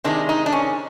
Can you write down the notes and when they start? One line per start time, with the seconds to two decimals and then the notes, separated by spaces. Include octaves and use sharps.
0.04 C3 D#3 G#3 D4
0.29 D#4
0.46 D4
0.52 C#4